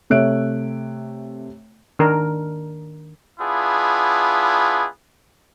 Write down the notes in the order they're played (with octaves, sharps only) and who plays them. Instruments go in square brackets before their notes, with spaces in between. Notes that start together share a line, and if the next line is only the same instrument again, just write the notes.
[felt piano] C3 A3 C#5 E5 F#6 D7
[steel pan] D#3 D4 A#4
[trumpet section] B3 D4 E4 F4 G#4